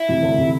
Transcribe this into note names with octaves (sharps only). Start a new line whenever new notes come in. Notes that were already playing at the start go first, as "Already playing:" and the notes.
Already playing: E4
C3 E3
D2
C3 E3